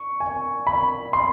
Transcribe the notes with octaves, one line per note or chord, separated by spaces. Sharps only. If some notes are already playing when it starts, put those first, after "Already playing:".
Already playing: C#6
G#5
B5
C6